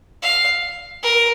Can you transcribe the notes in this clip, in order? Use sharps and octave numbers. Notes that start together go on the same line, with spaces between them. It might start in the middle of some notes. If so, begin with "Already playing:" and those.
F5
A#4